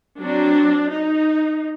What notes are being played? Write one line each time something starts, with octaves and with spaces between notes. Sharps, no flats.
F#3 C4 D4
D#4